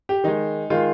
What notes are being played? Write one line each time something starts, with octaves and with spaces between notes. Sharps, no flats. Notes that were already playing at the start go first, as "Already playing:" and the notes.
G4
D#3 G#3 D#4
D#3 G#3 F4